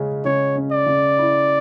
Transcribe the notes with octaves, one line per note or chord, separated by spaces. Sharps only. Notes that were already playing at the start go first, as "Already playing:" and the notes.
Already playing: C#3 G#3 C#4
C#3 C#5
C#4
D5
C#3
E4